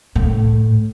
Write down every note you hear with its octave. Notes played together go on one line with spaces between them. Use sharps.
A2